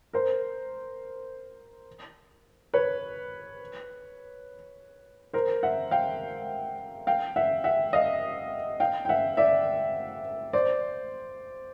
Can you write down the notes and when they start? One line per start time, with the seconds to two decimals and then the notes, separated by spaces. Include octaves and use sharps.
0.13 A#4 C5
2.74 B4 C#5
5.33 A#4 C5
5.63 E5 F#5
5.91 F5 G5
7.07 F5 G5
7.36 E5 F#5
7.64 E5 F#5
7.93 D#5 F5
8.80 F5 G5
9.05 G5
9.09 E5 F#5
9.37 D5 E5
10.53 C5 D5